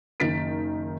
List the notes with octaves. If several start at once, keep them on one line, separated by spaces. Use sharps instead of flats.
F#1 D#3 A6 B6 D7